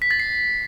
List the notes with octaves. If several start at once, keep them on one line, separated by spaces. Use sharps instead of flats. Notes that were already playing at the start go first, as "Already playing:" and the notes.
B6
A6
C7